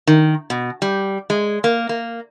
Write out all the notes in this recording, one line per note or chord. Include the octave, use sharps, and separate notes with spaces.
D#3
B2
G3
G#3
A#3
A#3